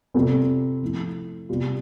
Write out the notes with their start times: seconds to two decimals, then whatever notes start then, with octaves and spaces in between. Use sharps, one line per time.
0.14 C3 G3 C4 F4 A4
0.82 F3 A3 E4
1.49 C3 G3 B3 F4